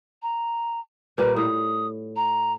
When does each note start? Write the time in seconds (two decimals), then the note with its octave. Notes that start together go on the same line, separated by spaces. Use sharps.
0.22 A#5
1.18 A#2 G3 A#3 B4
1.36 A2 D#6
2.16 A#5